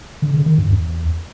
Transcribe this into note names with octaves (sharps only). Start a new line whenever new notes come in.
D3
C#3
D#3
G2
E2